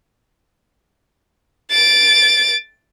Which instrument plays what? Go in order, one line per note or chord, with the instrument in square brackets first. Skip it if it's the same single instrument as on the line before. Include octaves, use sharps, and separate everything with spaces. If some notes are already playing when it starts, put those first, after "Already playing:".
[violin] A6 D7